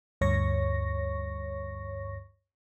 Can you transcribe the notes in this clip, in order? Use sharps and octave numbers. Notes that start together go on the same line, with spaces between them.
D2 G2 C#5 C#6 A#6